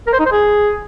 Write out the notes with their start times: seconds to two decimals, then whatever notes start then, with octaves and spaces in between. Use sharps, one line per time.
0.07 A#4
0.13 C5
0.19 D#4
0.26 C5
0.32 G#4